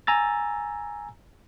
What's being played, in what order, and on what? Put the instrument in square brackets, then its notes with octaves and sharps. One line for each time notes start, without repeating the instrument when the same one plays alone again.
[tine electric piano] G#5 A#5 E6 A6